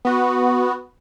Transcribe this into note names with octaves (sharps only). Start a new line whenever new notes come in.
B3 F#4